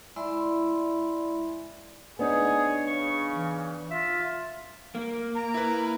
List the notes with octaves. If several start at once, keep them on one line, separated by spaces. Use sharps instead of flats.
G#3 E4 D5 E5 B5 C6
B3 D4 D#4 G#4 C#5
C#3 C#6
E3
F4 E5
A#3
A#5
E4 B4